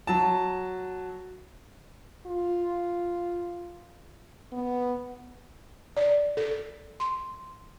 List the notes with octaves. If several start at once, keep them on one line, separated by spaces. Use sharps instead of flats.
F#3 A5
F4
B3
D5
A4
C6